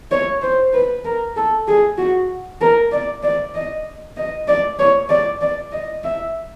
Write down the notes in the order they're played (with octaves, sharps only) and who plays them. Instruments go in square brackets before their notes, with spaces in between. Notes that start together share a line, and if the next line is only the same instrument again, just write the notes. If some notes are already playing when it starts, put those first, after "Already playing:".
[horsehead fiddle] C#5
C5
B4
A#4
A4
G#4
F#4
A#4
D5
D5
D#5
D#5
D5
C#5
D5
D5
D#5
E5